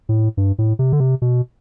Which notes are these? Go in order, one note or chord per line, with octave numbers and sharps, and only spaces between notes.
A2
G2
A2
C3
D3
C3
B2